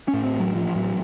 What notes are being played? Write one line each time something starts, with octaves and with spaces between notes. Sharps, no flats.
C#4
A2
C4
A1
F#3
A1 F3
A2 F#3